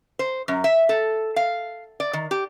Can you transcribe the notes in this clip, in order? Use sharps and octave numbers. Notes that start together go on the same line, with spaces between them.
C5
F#2
E5
A4
F5
D5
D#3
G4